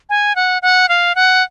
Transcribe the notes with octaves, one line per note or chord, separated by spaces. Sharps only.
G#5
F#5
F#5
F5
F#5